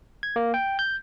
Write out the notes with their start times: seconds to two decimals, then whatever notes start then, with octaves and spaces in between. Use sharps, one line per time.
0.23 G#6
0.36 A#3
0.54 G5
0.79 G6